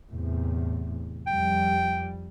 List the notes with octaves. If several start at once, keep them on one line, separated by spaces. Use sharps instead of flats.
E2 A2 C3
F2 G3 G5